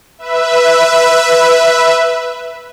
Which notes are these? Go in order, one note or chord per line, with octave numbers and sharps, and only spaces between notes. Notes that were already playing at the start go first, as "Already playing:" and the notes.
B4 E5